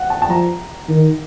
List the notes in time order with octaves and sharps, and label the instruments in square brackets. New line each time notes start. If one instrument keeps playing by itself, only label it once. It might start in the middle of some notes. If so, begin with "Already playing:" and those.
Already playing: [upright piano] F#5
A5
A5
[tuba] F3 [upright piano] A#5
[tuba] D#3